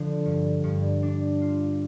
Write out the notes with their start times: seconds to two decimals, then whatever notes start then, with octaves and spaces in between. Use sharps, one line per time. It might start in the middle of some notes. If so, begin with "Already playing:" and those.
Already playing: D3 F3
0.26 G2
0.64 G2
1.03 D4
1.42 F4